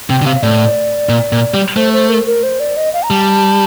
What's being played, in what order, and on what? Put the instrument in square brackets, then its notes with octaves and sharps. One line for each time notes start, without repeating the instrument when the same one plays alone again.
[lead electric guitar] C3 [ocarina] G5
[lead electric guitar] D3
[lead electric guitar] C3 [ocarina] F5
[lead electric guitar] A2 [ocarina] D5
[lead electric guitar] A#2
A#2
G3
[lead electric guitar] A3 [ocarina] C5
[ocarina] C5
A#4
A#4
C5
D5
D#5
F5
A#5
[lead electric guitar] G3 [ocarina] A5